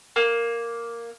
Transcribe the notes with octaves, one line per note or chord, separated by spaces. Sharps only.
A#3